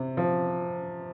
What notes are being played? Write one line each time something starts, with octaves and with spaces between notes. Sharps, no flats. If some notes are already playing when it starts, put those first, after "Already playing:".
Already playing: C3
F3